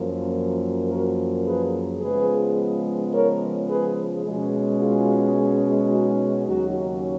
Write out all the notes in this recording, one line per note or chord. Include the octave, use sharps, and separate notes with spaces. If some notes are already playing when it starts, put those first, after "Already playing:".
Already playing: F#2 F3 A#3
F#4 A#4
G#4 B4
C#3 F3 G#3 B3 G#4 B4
A#4 C#5
G#4 B4
B2 G#3 C#4
F4 G#4
D#4 F#4
D#2 C#3 F#3 C#4 D#4 F#4